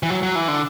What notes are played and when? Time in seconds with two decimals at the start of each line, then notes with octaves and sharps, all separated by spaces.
0.03 E3
0.10 F#3
0.23 F#3
0.35 E3
0.48 D3